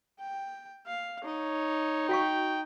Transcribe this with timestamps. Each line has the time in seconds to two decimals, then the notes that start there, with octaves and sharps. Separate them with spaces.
0.20 G5
0.86 F5
1.24 D#4 C#5
2.09 F#4 F5 G5 C#6